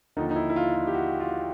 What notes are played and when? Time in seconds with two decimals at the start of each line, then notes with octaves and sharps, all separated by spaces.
0.17 D#2 D3 F3 D#4
0.31 D#4
0.36 E4
0.50 E4
0.56 F4
0.75 F4
0.87 G4
0.94 F#4
1.20 F4